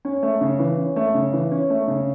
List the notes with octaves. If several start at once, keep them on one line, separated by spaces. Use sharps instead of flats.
C#4
A3
C#3
E3
C#4
A3
C#3
E3
C#4
A3
C#3